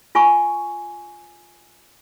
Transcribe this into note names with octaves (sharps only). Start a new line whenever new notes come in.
F4 G#5 C#6